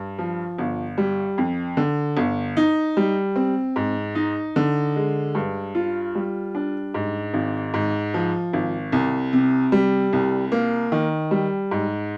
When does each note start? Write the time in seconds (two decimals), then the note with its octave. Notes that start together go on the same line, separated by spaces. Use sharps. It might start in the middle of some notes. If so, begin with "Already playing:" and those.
Already playing: G2
0.19 F3
0.58 G1
0.98 G3
1.38 F2
1.77 D3
2.17 G1
2.57 D#4
2.97 G3
3.36 C4
3.76 G#2
4.15 D#4
4.56 D3
4.96 G#3
5.35 G2
5.75 F4
6.15 G3
6.55 D4
6.94 G#2
7.34 G#1
7.74 G#2
8.14 F3
8.53 G#1
8.92 C2
9.33 C3
9.72 G3
10.13 C2
10.52 A#3
10.92 D#3
11.31 G3
11.71 G#2